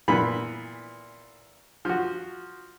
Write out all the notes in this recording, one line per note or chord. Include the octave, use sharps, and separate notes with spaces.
A#2 E3 B3 B5
F3 F#4